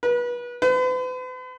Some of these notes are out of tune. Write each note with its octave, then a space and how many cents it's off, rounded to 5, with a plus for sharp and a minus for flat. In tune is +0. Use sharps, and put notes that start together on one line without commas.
B4 -30
B4 +45